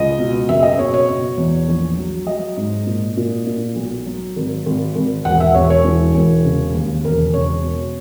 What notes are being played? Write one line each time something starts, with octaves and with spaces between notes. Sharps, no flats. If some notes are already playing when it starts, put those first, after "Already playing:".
Already playing: C#2 D#5
B2
F#1 E5
D#5
B2 C#5
C#5
B2
E2
A#1
F#3
F#3 D#5
G#2
A#2
A#2
A#2
B1
F#3
G#1
G#1
G#1
E1 F#5
E5
E1 C#5
C#5
E3
E1
C#3
D#2
E1 A#4
C#3 C#5
B2